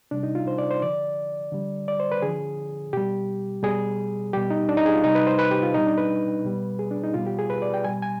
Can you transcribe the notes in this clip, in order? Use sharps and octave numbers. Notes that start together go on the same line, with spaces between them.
C3 G3 D4
D#4
F4
C5
D5
C5
D3 F3 D5
D3 G3
D5
C5
B4
D3 F3 G#4
B2 G3 G4
B2 G3 G#4
B2 G3 G4
D#4
D4
D#4
G#4
F4
C3 G3 D#4
B4
C5
B4
G4
F4
B2 G3 D#4
D4
B4
B2 G3
G#4
D4
D#4
B2 G3 F4
G4
G#4
B4
D5
G5
B2 G3 G#5
G#5